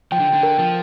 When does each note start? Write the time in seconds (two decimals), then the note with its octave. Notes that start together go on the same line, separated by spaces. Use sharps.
0.12 F3 G5
0.19 D3
0.33 D3
0.43 A#4
0.59 F3